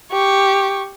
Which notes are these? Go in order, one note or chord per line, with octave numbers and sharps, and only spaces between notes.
G4 C#6